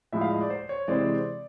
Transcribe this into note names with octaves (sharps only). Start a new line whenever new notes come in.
A2 F3 G#3 E5
F5
D#5
D5
C5
C#5
C3 E3 G#3 C4 D5